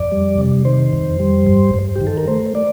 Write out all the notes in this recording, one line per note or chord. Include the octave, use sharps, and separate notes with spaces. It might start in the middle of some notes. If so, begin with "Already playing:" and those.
Already playing: F2 D5
G3
C3
D#3 C5
F2
G3
G2
G2
G4
D#3
A4
A#4
A3 C5
D5